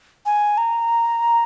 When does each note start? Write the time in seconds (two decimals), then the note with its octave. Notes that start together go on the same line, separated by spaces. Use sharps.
0.26 G#5
0.58 A#5